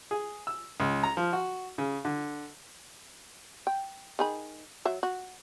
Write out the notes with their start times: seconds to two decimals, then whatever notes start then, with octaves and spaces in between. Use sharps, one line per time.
0.11 G#4
0.47 E6
0.80 C#2
1.03 A#5
1.17 F3
1.33 F#4
1.78 C#3
2.05 D3
3.67 G5
4.19 D#3 G#4 B5
4.85 F#3 E5
5.03 F#4